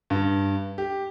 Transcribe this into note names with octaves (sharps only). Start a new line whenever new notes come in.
G2
G4